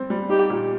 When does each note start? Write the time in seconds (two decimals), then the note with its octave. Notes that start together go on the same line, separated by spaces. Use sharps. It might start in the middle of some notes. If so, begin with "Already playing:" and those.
Already playing: G3 C4
0.10 G3
0.29 D#4 G4
0.50 A#2